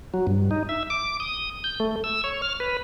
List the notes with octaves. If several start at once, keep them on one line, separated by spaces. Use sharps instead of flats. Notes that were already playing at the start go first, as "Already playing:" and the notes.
F#3
G2
D#4
E5
D6
D#6
G6
A3
E6
C#5
F6
B4